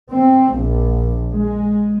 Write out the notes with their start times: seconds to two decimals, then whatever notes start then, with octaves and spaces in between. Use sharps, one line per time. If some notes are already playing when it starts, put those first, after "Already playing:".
0.11 C4
0.54 A#1
1.34 G#3